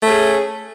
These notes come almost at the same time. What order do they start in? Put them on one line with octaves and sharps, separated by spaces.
A3 C#4 G#4